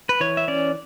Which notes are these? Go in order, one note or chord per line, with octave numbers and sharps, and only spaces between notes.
B4
E3 C#5
E5
C#4 D5